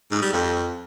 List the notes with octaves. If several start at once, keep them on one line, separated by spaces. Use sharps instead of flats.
G#2
G3
F2